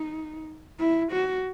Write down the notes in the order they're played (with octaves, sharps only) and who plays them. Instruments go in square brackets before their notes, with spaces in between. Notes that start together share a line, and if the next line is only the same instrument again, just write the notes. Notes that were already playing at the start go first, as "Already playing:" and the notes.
Already playing: [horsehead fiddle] D#4
E4
F#4